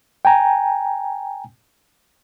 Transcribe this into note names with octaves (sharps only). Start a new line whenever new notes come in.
G5 G#5 A#5